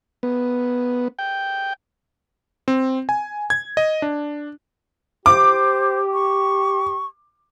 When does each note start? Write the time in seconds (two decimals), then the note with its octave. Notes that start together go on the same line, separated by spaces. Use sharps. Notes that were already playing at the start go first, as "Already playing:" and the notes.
0.23 B3
1.19 G5
2.68 C4
3.09 G#5
3.50 G#6
3.77 D#5
4.02 D4
5.26 G4 C5 D6
6.13 C#6